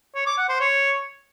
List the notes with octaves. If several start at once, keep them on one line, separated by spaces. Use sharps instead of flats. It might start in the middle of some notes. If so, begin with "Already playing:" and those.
C#5
D6
F#5
C5
C#5